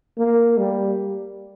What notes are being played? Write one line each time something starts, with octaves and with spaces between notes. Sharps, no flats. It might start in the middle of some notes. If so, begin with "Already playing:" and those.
A#3
G3